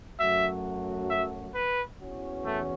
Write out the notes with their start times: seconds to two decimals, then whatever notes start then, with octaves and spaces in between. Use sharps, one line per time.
0.20 F#2 F#3 A3 F#4 E5
1.10 E5
1.55 B4
2.01 E2 E3 C#4 F#4
2.46 A3